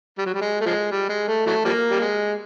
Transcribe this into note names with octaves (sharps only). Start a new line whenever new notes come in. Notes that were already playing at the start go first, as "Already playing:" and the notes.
G3
F#3
G3
G#3
A3
F3 G#3
G3
G#3
A3
E3 F#3 A3
F3 G3 A#3
G3
G#3